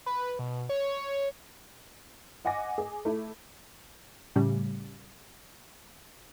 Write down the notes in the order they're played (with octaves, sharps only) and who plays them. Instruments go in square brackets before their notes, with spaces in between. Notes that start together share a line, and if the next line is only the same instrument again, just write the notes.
[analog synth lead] B4
B2
C#5
[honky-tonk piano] D#5 F#5 G#5 D6 A#6
G#4
A3 E4
[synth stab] A2 C#3 G3